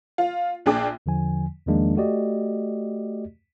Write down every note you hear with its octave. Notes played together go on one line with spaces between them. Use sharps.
F4
A#1 D4 G#4 G5 D6
E2 D3 F3 G#5
E2 D#3 F3 G#3 A#3 D4
A3 F#4 G4 D5 D#5